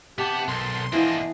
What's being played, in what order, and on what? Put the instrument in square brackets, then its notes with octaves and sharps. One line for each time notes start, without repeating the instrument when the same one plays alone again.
[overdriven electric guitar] C3 A5 [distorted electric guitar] B3 [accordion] G4
[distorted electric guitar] B1 [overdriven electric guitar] A4 A#4 [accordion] C6
[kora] E3 F3 B3 [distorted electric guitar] A#3 D4 [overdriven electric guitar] E4 D#5